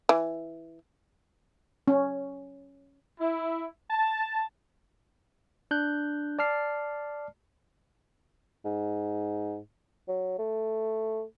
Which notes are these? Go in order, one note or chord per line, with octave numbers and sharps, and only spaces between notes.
E3
C#4
E4
A5
D4 F#6 G6
D5 A5 F6 C7
G#2
F#3
A3